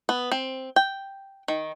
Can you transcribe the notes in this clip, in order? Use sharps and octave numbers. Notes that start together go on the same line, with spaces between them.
B3
C4
G5
D#3